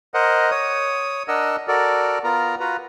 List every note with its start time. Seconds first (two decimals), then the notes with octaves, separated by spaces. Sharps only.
0.14 A#4 C5 D#5 F#5
0.51 C#5 D#6
1.28 D4 A#4 D#5 F#5 E6
1.68 F#4 A4 A#4 D5
2.24 B3 F4 A#4 A#5
2.60 F4 F#4 B4 A#5